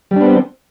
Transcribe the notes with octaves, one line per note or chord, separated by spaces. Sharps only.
G3 B3 C4 D4